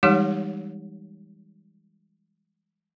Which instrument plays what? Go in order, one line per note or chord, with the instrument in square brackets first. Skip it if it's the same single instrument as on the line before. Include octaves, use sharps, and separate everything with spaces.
[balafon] E3 G3 G#3 D#4 G4 C#5